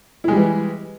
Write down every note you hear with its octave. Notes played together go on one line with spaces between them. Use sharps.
E3 G3 G#3 E4